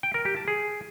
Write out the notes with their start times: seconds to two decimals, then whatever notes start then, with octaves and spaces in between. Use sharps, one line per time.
0.03 G5
0.14 A#4
0.25 G4
0.36 A5
0.48 G#4